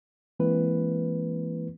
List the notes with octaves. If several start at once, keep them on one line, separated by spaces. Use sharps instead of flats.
E3 G#3 A#3 C4 E4 B4